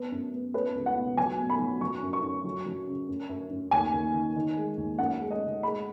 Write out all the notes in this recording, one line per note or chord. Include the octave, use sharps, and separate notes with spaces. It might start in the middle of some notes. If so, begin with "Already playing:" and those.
Already playing: B3
F#2
B3
B3 B4
C#2
F#5
B2
F#3 G#5
B2
B5
F#3
F#3 C#6
F#2
C#6
F#2
F#3
F#3
C#3
F#2
F#2
F#2
D#2 G#5
D#2
D#3
D#3
G#3
D#2
F#2 F#5
G#3
D#5
C#3
G#3 B5